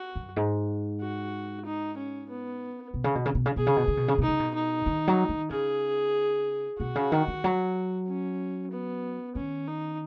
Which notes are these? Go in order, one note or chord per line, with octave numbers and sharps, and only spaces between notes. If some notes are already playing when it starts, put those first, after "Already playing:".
Already playing: F#4
F#2
G#2
F#4
D#4
C#4
B3
B2
C#3
B2
C#3
B2
C#3
B2 G#4
C#3
B2
C#3
B2
C#3
B2 D#4
C#3
B2
D#4
D#3
F#3
D#3
C#3 G#4
B2 F#4
C#3
D#3
D#3
F#3
C#4
B3
D#3 C#4
D#4